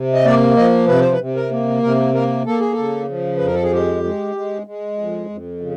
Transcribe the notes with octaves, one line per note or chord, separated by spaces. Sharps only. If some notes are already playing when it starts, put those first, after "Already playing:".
Already playing: C3
D#5
A#3 D5
F3 D#5
C3 B4
C5
B4
C3
A#4
A#3
C3 A#4
A#3 A#4
A#3 A4
G#4
A4
C#3
F3
F2 B4
A#4
A4
G#4
G#3 G4
G#3
G#3
G#3
F2
F2
C#3